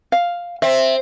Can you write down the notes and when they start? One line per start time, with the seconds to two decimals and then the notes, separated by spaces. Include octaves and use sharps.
0.12 F5
0.62 C4 E5